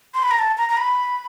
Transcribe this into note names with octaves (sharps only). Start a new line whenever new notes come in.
C6
B5
A#5
A5
A#5
A#5
B5